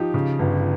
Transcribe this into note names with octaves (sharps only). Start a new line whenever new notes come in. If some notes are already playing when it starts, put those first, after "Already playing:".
Already playing: F3 D#4 G4
C#3
G1